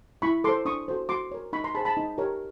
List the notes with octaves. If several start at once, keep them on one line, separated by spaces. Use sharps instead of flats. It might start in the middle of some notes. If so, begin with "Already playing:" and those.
E4 B5 C#6
A4 C5 C6 D6
D4 C#6 D#6
F#4 A4 C5
F#4 C6 D6
A#4 C#5
D#4 B5 C#6
A#5 C6
G#4 C5 A5 B5
A5 B5
D#4
G4 A#4 C#5